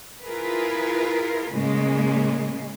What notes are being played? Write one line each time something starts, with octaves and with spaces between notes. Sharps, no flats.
E4 F4 G#4 A#4 B4
A2 C#3 G#3 A#3